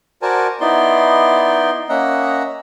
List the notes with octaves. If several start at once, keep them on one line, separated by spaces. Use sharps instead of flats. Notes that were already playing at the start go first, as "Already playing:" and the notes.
F#4 A#4 C5 D5 G#5 A5
B3 D#4 E4 D5 C6
A#3 C#4 D#5 E5 F#5 A#5